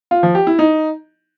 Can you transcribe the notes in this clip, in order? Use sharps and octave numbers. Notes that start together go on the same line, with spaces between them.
F4
F3
G4
E4
D#4